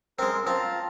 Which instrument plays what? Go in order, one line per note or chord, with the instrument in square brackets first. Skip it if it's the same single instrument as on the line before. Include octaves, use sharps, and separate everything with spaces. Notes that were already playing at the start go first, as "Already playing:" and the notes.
[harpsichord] G#3 C4 [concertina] A#4
[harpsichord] C4 [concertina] F4 A5 A#5